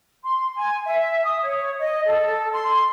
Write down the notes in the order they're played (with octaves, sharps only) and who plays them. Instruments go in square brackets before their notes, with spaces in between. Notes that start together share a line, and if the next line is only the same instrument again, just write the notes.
[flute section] C6
G#5
E5
D#6
C#5
D#5
A4
C6